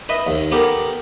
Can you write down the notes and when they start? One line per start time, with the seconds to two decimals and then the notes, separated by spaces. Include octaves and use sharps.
0.09 B4 D#5 E5
0.27 D#2
0.52 B3 G4 A4 A#4